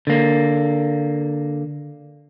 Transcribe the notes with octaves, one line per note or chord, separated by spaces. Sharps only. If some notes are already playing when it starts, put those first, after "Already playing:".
D3 A#3